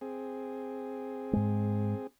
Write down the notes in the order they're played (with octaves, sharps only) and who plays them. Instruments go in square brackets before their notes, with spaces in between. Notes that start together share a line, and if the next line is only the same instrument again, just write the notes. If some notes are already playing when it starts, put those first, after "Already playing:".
[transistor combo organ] C4 G#4
[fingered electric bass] G#2 G#3